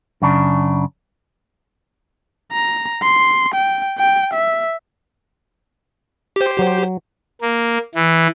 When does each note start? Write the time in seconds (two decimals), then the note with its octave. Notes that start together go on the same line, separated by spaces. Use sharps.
0.22 F#2 C#3 D4
2.52 A#5
3.02 C6
3.54 G5
3.98 G5
4.33 E5
6.36 G4 C5
6.59 F#3
7.41 A#3
7.95 E3